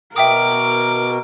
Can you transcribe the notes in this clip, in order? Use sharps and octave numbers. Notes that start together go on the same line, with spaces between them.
B2 A#4 E5 G5 D6 D#6